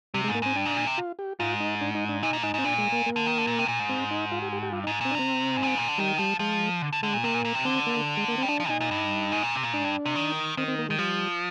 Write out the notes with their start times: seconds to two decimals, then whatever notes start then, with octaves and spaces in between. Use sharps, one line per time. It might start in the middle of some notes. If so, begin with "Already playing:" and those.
0.14 C3 G3
0.24 G#3
0.28 G#2
0.35 A#3
0.42 G#2 C4
0.56 G2 D4
0.65 G#2
0.77 A#2
0.86 C3
0.98 F4
1.19 G4
1.39 G#2 F4
1.60 D#4
1.81 D4
1.95 D#4
2.09 D4
2.23 A#2 D#4
2.33 A#2
2.43 G#2 D#4
2.54 G#2 C4
2.64 A#2 D4
2.78 G#3
2.92 A#3
3.06 A#3
3.16 D3
3.26 D#3
3.38 D3
3.47 A#2
3.59 C3
3.68 A#2
3.79 G#2
3.89 C4
4.11 D#4
4.32 F4
4.42 G4
4.53 G4
4.63 G4
4.72 G2 F4
4.84 D#4
4.87 G#2
5.01 A#2 C4
5.11 D4
5.15 C3 C4
5.57 G#2
5.63 A#2
5.67 G#2
5.77 A#2
5.88 D3
5.98 D#3 G3
6.19 F3 G3
6.39 F3 G#3
6.82 D3
6.93 D3
7.03 D3 G#3
7.14 A#2
7.24 C3 A#3
7.34 A#2
7.45 A#2
7.55 C3
7.65 D3 C4
7.87 A#3
8.17 G#3
8.28 A#3
8.38 C4
8.43 G3
8.49 F3 D4
8.60 F3
8.69 A#2 D#4
8.80 A#2
8.91 G2
9.32 G#2
9.43 A#2
9.53 C3
9.63 A#2
9.73 G#2 D4
9.84 G2
10.06 C3
10.16 D#3
10.57 D#3 C4
10.68 C4
10.78 A#3
10.89 D#3 G#3
10.99 F3 G3